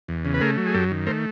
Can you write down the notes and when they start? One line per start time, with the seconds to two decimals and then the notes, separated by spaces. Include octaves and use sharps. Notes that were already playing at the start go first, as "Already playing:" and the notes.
0.08 E2
0.25 C#3
0.34 B4
0.41 A3 G#4 A#4
0.57 F#3
0.66 G#4
0.74 F#2 G4 A4
0.91 D#3
1.07 A3 A#4 C5